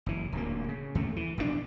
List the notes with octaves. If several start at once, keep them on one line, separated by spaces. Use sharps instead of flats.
F#1 E3
D1 D2 A3 A#3
C#3
D#2 A3
E3
F1 B1 A2 D4